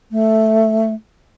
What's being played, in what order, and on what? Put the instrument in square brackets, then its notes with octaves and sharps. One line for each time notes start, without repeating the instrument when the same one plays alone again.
[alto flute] A3